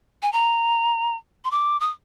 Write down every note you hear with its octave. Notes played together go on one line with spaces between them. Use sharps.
G#5
A#5
C6
D6
D#6